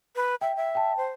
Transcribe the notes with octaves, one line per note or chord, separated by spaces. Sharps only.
B4
E5 G5
E5
G5 A5
C5